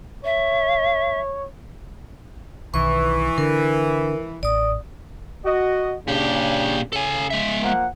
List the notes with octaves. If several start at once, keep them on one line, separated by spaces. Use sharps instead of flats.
C#5 E5
B1 D#3 E3 C#6
D3 A#4
A1 D5 D#6
F#4 D#5
A#2 C#3 D4 G4
C#3 A4 G#5
G#3 E5
F3 A#3 F#5